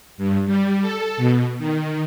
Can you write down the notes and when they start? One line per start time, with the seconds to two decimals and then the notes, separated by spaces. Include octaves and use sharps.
0.18 G2
0.46 G3
0.81 A4
1.17 B2
1.59 D#3